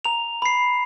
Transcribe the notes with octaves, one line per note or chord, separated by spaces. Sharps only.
A#5 F7
B5 C7